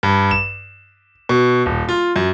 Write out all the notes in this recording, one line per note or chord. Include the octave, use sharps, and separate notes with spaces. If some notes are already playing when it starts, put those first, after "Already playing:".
G2
E7
B2
D#1
F4
F#2